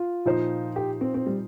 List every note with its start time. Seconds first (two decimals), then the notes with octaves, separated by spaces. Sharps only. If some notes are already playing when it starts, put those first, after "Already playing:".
Already playing: F4
0.25 A#2 F3 D#4 C5
0.76 G4
1.01 C4
1.14 C4
1.26 G3